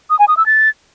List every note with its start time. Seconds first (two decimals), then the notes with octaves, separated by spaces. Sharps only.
0.10 D#6
0.19 G#5
0.28 D#6
0.37 E6
0.46 A6